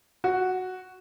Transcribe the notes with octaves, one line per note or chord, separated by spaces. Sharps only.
F#4